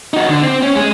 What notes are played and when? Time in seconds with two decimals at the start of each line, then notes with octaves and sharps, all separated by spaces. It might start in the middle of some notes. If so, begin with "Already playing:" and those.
0.14 D#4 F#4
0.29 D3
0.43 C4
0.63 C#4
0.75 G#3 G#4